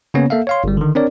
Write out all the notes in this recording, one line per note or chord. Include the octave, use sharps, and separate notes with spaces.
C#3 A#3 B3 C#4 C#5
A#3 A4 E5 F5
C#5 F5 C6
G1 G3
D3 D#3
C4 D4 A#4 C#5 D5